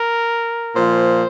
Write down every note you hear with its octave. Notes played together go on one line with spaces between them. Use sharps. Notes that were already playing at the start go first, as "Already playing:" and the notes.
Already playing: A#4
A#2 F3 C5